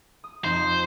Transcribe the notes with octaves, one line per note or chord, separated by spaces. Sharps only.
D#6
F2 F3 D#4 C5